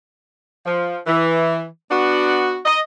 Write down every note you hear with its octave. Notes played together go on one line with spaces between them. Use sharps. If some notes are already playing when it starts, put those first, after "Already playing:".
F3
E3
B3 D4 F#4
D#5